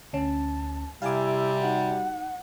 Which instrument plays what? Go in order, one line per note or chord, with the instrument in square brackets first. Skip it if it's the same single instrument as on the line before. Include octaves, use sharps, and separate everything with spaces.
[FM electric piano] D2 C#4 [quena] A5
[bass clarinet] C3 [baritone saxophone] G3 [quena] E4 [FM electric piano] F5 G#5 D6
[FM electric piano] D#4 F#4 [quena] F#5